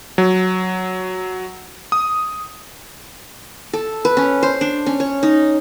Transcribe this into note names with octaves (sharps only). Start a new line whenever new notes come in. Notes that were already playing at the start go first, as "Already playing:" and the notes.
F#3
D#6
A4
B4
C#4
C5
D4
C#4
C#5
D#4